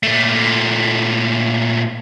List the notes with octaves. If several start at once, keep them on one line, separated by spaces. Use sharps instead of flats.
A#2 A3